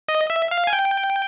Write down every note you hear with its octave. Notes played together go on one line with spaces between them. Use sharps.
D#5
E5
F5
G#5
G5